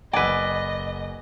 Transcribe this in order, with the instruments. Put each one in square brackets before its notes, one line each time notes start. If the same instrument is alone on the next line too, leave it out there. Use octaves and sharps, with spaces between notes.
[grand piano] F#1 E6 G#6 [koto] B4 D5 [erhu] D#5 [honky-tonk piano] F#5 G#5